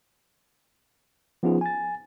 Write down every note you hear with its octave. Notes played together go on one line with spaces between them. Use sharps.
F3 B3 C#4 D#4 F4 G#4
G#5 A6